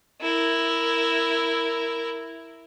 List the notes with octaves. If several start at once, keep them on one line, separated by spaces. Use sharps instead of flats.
E4 A#4